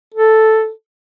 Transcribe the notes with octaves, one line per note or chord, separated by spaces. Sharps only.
A4